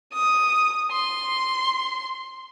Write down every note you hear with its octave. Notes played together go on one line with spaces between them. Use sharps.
D#6
C6